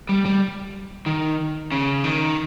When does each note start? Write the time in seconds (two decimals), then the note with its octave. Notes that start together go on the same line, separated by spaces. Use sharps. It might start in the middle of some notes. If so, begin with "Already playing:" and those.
0.09 G3
0.26 G3
1.06 D#3
1.72 C#3
2.04 D#3